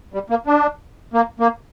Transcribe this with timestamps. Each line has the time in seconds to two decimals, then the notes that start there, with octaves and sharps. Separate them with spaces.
0.14 G3
0.30 A#3
0.47 D4
1.14 A#3
1.40 A#3